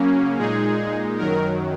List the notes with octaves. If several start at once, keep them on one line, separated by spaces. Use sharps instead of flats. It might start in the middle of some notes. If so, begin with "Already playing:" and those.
Already playing: C#3 F#3 A#3 C#4
A#2 G#3 D#4 G#4
F#2 D#3 F#3 A#4